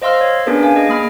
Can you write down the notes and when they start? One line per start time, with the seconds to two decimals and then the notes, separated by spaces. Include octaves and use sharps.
0.02 C5 D#5 F5 C6 E6 F6
0.21 C#5
0.46 B3 C#4 D4 G#4 A#4 B4
0.63 F5 G#5
0.76 G#4 D#5
0.89 A#3 G#4 B5 F6